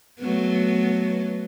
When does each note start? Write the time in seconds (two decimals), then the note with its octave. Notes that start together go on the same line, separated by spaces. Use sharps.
0.19 F#3 A3 B3